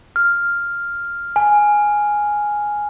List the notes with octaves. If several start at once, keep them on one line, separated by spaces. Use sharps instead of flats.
F6
G#5